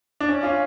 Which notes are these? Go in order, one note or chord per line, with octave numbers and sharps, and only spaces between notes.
D4
C#4
C#4 F4